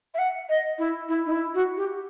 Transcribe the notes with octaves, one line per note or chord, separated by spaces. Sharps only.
E5
F#5
D#5
E4
E4
D#4
E4
F#4
G4